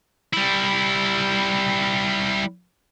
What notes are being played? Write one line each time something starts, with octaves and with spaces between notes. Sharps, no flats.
G3 E4